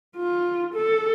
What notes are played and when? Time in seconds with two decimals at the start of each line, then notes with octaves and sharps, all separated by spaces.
0.16 F4
0.74 A4